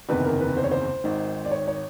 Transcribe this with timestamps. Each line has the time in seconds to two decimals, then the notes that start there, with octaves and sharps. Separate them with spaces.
0.09 F#1 E2 C3 D#3 B4
0.25 A#4
0.40 B4
0.57 C5
0.64 C#5
0.71 C5
1.04 G#1 G#2 D#3
1.45 D5
1.51 C#5
1.67 C#5